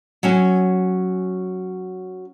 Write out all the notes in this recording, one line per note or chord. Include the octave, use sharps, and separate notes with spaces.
F#3 C#4 G#5